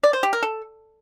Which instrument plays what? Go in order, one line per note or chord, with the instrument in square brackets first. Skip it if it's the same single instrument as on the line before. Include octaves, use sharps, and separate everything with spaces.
[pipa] D5
C5
G4
A#4
A4